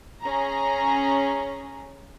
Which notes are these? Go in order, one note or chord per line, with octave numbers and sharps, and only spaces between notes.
C#4 G#4 A#5